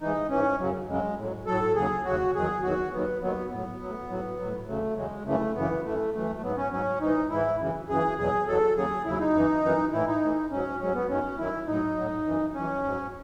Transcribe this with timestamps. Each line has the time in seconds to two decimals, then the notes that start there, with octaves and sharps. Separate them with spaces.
0.01 G#2 E3 D#4
0.30 G#2 E3 C#4
0.59 F#2 C#3 F#3
0.88 F#2 C#3 F#3 G#3
1.18 A2 F#3
1.46 A2 F#3 A4
1.76 D#2 C#3 F#3 G#4
2.05 D#2 C#3 F#3 F#4
2.35 E2 D#3 F#3 G#4
2.63 E2 D#3 F#3 F#4
2.92 D#2 D#3 F#3 B3
3.21 D#2 D#3 F#3 B3
3.51 A2 F#3 B3
3.81 A2 F#3
4.09 A2 F#3
4.39 A2 F#3
4.67 E2 C#3 F#3 A3
4.96 E2 C#3 F#3 G#3
5.25 F#2 C#3 E3 A3
5.55 F#2 C#3 E3 B3
5.85 F#2 E3 A3
6.14 F#2 E3 A3
6.35 A3
6.42 G#2 F#3 B3
6.57 C#4
6.72 G#2 F#3 C#4
7.00 G#2 E3 D#4
7.30 G#2 E3 E4
7.59 F#2 C#3 E3
7.88 F#2 C#3 E3 G#4
8.18 E2 B2 F#3 G#4
8.47 E2 B2 F#3 A4
8.76 D#2 C#3 F#3 G#4
9.05 D#2 C#3 F#3 E4
9.20 D#4
9.34 F#2 E3
9.63 F#2 E3
9.92 A2 E3 E4
10.07 D#4
10.21 A2 E3
10.51 G#2 F#3 C#4
10.80 G#2 F#3 C#4
10.94 B3
11.09 F#2 D#3 F#3 C#4
11.38 F#2 D#3 F#3 E4
11.67 A2 F#3 D#4
11.97 A2 F#3
12.26 F#2 E3
12.54 F#2 E3 C#4
12.84 G#2 F#3